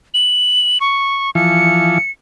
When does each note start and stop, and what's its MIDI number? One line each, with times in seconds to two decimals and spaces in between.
0.14 0.78 102
0.81 1.30 85
1.35 1.98 52
1.35 1.98 53
1.35 2.10 97